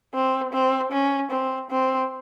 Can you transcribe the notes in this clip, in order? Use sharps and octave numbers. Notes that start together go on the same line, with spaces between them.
C4
C4
C#4
C4
C4